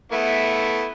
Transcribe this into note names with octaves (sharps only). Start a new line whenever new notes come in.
A3 B3 E4